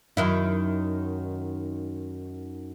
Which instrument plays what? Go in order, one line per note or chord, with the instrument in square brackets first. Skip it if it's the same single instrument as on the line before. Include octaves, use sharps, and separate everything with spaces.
[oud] F#2 D#3 E4